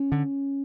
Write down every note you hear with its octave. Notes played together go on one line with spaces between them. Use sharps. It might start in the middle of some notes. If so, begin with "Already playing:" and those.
Already playing: C#4
D3